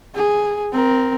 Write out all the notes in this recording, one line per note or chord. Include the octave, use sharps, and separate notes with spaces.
G#4
C4 A#4